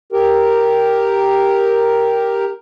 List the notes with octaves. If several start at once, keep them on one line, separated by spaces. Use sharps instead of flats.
G4 A#4